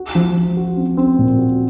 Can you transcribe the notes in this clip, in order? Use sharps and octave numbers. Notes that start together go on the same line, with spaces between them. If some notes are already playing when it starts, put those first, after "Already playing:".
Already playing: F#4
F3
F3
F#4
C4
C4
A#2
F#4